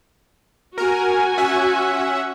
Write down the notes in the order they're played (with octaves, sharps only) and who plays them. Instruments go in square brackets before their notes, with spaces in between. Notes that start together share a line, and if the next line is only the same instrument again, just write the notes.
[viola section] F#4 G#5 [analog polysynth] A#4
[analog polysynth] C#4 E5 F#5